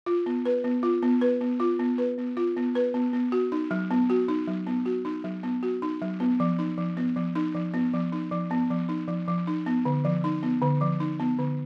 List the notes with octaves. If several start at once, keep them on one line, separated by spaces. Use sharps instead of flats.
F4
B3
B4
B3
F4
B3
B4
B3
F4
B3
B4
B3
F4
B3
B4
B3
B3
F#4
D#4
F#3
B3
F#4
D#4
F#3
B3
F#4
D#4
F#3
B3
F#4
D#4
F#3
B3
F3
D#4
F3
B3
F3
D#4
F3
B3
F3
D#4
F3
B3
F3
D#4
F3
F3
D#4
B3
D3
F3
D#4
B3
D3
F3
D#4
B3
D3